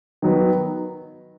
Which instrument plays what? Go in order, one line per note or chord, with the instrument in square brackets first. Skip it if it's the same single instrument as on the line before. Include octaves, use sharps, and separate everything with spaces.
[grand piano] D#3 F#3 B3